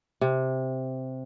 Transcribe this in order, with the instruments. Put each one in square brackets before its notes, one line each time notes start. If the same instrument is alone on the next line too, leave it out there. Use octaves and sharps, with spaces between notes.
[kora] C3